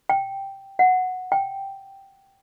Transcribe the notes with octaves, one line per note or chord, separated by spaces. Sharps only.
G5
F#5
G5